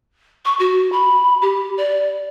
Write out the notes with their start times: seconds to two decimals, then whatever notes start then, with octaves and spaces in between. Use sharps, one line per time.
0.45 C#6
0.59 F#4
0.92 B5
1.42 G4
1.77 D5